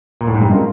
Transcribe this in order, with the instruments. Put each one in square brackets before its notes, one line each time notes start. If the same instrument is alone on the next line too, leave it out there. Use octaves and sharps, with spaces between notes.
[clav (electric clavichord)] A#2
A2
G#2
G2
[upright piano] G#3 C#4 F4 A#4